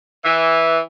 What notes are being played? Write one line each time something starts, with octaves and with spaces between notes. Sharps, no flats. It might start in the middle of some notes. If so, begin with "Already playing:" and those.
E3